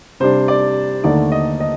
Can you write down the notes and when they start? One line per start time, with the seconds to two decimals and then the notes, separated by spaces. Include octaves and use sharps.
0.20 C3 G3 D4 C5
0.48 D5
1.04 D#2 D3 A3 D#4 D5
1.32 D#5
1.60 D#5